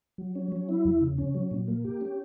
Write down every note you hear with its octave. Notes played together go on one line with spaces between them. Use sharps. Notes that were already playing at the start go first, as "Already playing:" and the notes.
F#3
C#4
F#3
E4
E2
C#3
C#4
F#3
A#2
A#3
G4
C#4